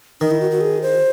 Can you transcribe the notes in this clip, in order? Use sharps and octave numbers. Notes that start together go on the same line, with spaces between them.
D#3 D#4
E4
F#4
F#4
G#4
C5